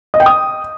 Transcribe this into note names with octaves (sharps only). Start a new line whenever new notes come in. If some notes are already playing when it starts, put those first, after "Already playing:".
D#5
G5
D#6